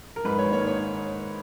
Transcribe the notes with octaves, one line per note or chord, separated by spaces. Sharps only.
A#4
G#2 B4
C#5
D#3
A#3 C#5
C#5